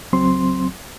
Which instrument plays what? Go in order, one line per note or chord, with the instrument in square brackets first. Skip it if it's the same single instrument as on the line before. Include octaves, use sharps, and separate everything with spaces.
[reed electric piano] C#2 F#3 C4 C6